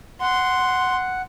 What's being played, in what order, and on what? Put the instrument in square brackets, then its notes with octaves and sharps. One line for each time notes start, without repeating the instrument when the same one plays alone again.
[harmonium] F#5 [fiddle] C6